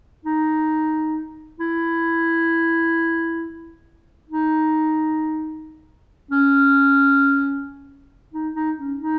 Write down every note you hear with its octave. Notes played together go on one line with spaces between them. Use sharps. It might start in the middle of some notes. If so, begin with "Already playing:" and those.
D#4
E4
D#4
C#4
D#4
D#4
C#4
D#4